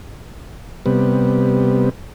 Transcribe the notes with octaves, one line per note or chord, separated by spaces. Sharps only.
C3 G3 B3